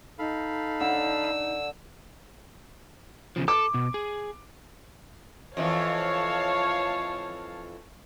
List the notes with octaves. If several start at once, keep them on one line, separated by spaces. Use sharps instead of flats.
D#4 A4 F5 B5
D3 E6
E2 C#3 F3
A4 D6
B2
G#4
F2 C3 E3 C#5 F5 A5